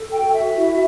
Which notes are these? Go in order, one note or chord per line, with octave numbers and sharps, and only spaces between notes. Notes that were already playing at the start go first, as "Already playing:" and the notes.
Already playing: A4
F#4 G5
E5
E4